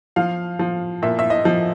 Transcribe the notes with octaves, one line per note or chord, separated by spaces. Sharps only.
F3 F5
F3
A#2 E5
E5
D#5
F3